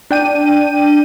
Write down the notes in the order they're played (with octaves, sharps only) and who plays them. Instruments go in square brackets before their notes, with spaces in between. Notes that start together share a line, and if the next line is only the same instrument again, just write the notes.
[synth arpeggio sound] D4 G5 D#7